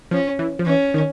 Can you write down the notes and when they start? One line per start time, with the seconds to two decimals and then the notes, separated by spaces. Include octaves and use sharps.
0.11 F3 C#4
0.39 E3
0.59 F3
0.66 E3 C#4
0.94 D#3